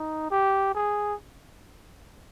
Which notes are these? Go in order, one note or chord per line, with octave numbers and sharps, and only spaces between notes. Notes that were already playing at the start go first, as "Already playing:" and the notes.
Already playing: D#4
G4
G#4